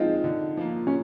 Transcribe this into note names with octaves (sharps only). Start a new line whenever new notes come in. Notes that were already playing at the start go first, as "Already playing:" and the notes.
Already playing: F3 G#3 C4 D#4 F4
D3
F3 A#3
C#4